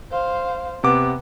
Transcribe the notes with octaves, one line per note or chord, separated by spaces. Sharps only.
C5 F5
C3 B3 D6